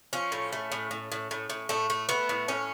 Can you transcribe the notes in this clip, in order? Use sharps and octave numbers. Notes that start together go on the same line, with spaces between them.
F3 C#4
A2
A3
A2
A2
A2
A2
A2
A2 A3
A3
A3 B3
A2
A2 C#4